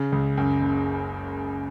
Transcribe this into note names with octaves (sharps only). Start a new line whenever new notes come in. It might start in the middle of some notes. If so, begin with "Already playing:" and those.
Already playing: C#3
C#2
F#2
F#1